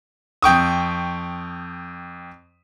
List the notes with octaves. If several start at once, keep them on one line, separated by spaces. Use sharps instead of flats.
F2 G5 C#6 D#6